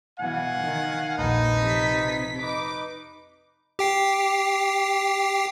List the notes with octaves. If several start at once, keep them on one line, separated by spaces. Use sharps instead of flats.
B2 E3 F5 F#5 G#5
D#3
A#1 D#2 D#4 B4 A5
F2 C3 B6
D#4 B4 D#5 D6
G4 G5 C7